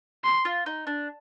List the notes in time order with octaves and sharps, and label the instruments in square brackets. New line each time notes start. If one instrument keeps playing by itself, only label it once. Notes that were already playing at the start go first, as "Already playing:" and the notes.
[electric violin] C6
[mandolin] F4
D#4
D4